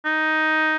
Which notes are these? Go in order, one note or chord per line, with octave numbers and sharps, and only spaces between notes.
D#4